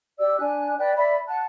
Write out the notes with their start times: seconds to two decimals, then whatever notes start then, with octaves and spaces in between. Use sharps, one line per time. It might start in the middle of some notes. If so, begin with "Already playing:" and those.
0.19 G4 D5 E6
0.38 D4 G#5 F#6
0.78 B4 D5 G5 F#6
0.96 D5 E5 B5
1.28 F#5 A5 F#6